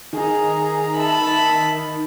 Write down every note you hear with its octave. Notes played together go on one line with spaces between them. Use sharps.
D#3 G#4 A#5
E5 A5 B5 E6